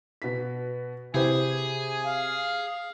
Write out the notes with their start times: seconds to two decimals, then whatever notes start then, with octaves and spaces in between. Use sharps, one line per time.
0.22 B2 B6
1.14 C3 E4 G4 G#4 C5 G#5
2.05 F5